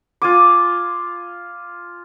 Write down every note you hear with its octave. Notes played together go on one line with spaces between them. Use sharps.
F4 G#5 D6